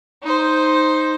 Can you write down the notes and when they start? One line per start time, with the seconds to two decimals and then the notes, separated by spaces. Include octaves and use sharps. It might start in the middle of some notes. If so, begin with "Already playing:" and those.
0.23 D#4 C5